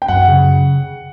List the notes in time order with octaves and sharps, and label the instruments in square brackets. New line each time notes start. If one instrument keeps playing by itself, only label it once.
[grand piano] G5
[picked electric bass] F#2 [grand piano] F#5
[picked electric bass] C#3